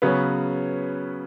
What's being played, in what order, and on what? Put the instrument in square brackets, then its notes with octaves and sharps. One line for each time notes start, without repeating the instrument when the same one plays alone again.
[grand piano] C#3 F#3 B3 C#4 B4